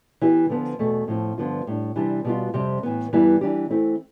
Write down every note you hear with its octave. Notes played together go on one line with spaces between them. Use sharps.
E3 B3 E4 G4
D3 F3 B3
E2 B2 A3
A2 F3 C4
G2 D3 F3 B3 F4
A2 G3 D4
C3 E3 G3 D4
B2 G3 B3 F4
F2 C3 G3 C4
A2 E3 B3
G2 E3 G3 B3 E4
E3 G3 D4 G4
E3 A3 C4 E4